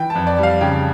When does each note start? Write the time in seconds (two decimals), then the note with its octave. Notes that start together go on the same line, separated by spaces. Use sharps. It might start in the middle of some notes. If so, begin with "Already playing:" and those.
Already playing: E3 G5
0.10 A5
0.15 F2
0.27 D5
0.38 G3 F5
0.61 C#3 G5